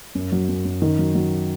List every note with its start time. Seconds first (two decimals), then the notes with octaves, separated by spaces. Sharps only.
0.15 F#2
0.32 F#3
0.49 F#2
0.65 F#2
0.82 D#3
0.99 F#3
1.15 F#3